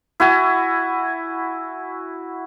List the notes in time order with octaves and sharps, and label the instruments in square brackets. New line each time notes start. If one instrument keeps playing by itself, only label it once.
[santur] E4 F#4 G#5